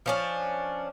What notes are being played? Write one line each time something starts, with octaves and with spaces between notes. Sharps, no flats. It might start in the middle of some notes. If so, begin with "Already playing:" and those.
F3 C#4 D4